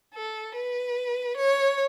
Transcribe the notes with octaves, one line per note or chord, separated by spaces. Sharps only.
A4
B4
C#5